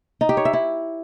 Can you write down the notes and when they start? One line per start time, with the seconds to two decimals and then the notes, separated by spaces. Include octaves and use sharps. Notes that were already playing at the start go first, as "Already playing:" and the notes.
0.21 D#4
0.29 G4
0.37 C#5
0.45 E5
0.53 E4